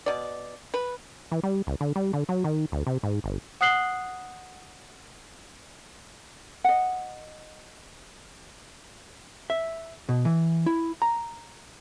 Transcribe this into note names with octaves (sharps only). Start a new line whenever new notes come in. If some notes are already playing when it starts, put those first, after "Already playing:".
B2 D5
B4
E3
G3
C#2
D3
G3
D3
F#3
D#3
D2
C3
G#2
G1
F#5 D#6 F#6 C7 F#7 G7
D#5 F#5
E5
B2
E3
E4
A#5